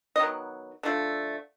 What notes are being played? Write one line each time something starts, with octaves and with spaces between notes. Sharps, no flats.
D#5
D#3 F#3 B3
D3 F3 A3